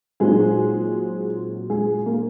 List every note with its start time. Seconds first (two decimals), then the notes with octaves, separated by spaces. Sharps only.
0.20 A#2 F#3 G#3 C4 D#4 G#4
1.70 G#3 G#4
2.06 A#3 A#4